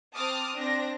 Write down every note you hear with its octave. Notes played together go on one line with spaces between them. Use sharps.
C4 A5 D6 D#6 F6
C4 D4 A#6